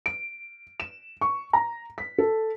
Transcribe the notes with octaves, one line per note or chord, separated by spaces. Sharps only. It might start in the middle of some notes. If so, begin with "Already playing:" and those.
D7
E7
C#6
A#5
B6
A4